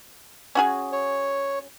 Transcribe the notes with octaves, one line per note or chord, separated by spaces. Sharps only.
C#4 F#4 G#4
C#5